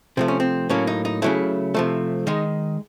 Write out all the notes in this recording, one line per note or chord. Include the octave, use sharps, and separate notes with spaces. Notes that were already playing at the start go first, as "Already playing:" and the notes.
C3 F3 A3 C4
C#4
C4
A2 F#3 A#3 C#4
D#4
D#4
C#3 F#3 A3 E4
C3 F3 A3
D#3 G#3 D#4